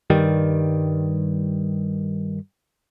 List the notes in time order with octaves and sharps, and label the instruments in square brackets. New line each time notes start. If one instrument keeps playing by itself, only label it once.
[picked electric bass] G2 D#3 G3